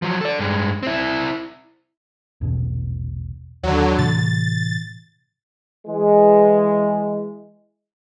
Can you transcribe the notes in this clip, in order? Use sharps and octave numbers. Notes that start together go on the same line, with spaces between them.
F3 F#3
A4 D5
G2 G#3
C4 E4
A#1 E2 B2
D#2 D3 F#3
A2 C3 E3 A6
E3 G#3